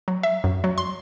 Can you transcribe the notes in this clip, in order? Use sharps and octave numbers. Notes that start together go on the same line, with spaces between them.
F#3
E5
F#2
F#3
C6